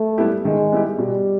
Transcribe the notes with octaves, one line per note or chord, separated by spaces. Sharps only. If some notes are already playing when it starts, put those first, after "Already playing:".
Already playing: A3
G3 B3 E4 G4
D#3 G#3
G3 B3 E4 G4
B2 G3